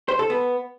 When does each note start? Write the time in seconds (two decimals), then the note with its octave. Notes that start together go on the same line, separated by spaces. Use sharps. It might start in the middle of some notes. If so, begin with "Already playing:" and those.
0.08 C5
0.19 A4
0.30 B3